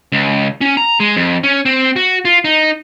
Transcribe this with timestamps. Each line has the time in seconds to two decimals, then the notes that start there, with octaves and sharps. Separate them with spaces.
0.12 C#2
0.61 C#4
0.77 A#5
1.00 G#3
1.17 F2
1.43 C#4
1.65 C4
1.96 F#4
2.25 F4
2.45 D#4